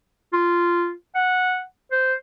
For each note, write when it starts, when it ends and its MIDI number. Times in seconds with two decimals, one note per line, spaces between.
0.33 0.92 65
1.15 1.61 78
1.92 2.14 72